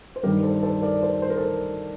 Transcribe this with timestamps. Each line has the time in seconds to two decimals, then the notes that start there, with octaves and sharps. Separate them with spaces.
0.16 C5
0.23 G2 D#3 G3 G4 A#4
0.43 A4 C5
0.63 A4 C5
0.82 A#4 D5
1.02 A4 C5
1.22 C5
1.30 A#4
1.37 A4 C5